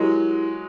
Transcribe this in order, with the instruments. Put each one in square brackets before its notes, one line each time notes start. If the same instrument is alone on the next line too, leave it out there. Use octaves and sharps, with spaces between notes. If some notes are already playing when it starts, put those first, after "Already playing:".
Already playing: [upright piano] F#3 G#3 [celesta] E4 G4 A#4